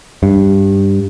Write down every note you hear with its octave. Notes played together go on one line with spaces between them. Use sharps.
G2